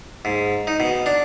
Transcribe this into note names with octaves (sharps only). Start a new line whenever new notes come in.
G#2
D#4
B2
D4